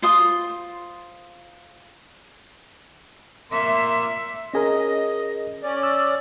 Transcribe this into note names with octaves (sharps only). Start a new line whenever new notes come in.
F4 C5 C6 D#6
A#3 E5 C6
C#4 G#4 A#4 D#5
C#4 D5
E6